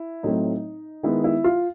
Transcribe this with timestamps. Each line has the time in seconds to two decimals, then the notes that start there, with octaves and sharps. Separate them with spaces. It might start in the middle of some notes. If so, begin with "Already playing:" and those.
Already playing: E4
0.23 A2 F#3 A3 C4 D#4
1.03 D#3 G#3 B3 E4
1.24 E4
1.44 F4